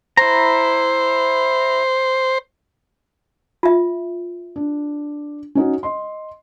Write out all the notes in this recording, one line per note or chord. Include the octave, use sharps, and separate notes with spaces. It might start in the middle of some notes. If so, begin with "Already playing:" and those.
E4 C5 A#5
F4 E5
D4
C#4 D#4 F#4
D#5 C6